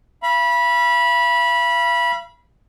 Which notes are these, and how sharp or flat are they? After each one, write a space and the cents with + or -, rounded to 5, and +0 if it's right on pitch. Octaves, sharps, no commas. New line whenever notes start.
F5 -45 B5 -20